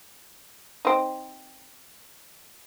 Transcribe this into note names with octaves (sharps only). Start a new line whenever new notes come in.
C4 D#4